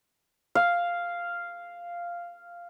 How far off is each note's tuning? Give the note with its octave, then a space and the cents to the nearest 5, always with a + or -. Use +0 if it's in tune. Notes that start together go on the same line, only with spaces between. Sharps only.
F5 -5